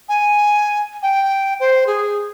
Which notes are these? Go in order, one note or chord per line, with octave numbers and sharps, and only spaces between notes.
G#5
G5
C5
G#4